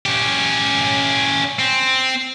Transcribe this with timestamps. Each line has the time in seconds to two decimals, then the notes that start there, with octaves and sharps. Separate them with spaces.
0.06 C#4 G4
1.59 C4